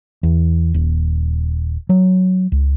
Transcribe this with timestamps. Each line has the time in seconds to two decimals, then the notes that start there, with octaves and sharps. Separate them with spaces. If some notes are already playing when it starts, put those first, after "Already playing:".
0.23 E2
0.74 D#1
1.89 F#3
2.52 C#2